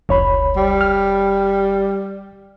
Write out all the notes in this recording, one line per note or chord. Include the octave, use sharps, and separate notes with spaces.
F1 C#2 C#5 B5
G3
F6